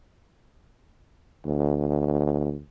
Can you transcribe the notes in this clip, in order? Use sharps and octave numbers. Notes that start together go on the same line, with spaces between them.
D2